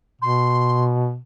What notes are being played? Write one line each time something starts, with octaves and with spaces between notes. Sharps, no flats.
B2 C6